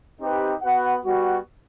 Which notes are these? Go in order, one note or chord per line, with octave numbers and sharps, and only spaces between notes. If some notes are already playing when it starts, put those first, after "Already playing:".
C4 D#4 G4 B4
B3 F#4 B4 F#5
G3 B3 F#4